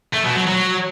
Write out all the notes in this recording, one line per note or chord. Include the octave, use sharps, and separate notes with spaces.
A3
B2
F#3
F#3